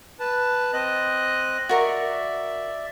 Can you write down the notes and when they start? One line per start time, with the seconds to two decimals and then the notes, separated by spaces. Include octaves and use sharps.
0.20 B4 A5
0.73 C4 D#5 F#6
1.69 F#4 A#4 D5 E5 C#6